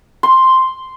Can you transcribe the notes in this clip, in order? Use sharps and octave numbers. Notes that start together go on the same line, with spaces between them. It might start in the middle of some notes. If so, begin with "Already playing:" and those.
C6